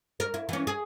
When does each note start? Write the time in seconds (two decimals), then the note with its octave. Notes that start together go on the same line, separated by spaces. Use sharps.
0.20 A#4
0.34 E4
0.49 E3 C#4
0.67 G#4